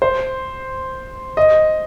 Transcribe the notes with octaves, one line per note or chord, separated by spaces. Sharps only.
C5
D#5